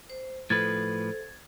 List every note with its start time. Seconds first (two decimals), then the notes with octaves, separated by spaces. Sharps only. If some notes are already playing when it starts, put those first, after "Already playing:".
0.10 C5
0.50 A2 F3 A4 B4 C5 G#6 A6